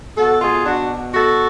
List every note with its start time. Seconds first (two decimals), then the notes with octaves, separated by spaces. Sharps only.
0.17 B2 F#4 A4
0.42 F4 G#4
0.66 D4 F#4
1.15 F#4 A4